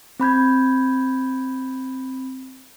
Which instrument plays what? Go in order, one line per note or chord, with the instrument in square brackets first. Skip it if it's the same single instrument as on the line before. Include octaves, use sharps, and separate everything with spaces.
[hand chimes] C4 B5 G6 G#6